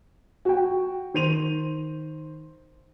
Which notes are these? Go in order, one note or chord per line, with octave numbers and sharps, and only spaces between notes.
F#4 G5
D#3 C5 D#7 F7